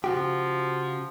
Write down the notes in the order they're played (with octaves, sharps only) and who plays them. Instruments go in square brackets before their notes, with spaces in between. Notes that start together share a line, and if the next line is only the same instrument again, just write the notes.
[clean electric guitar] C#3 F#4 G4 [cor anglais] F3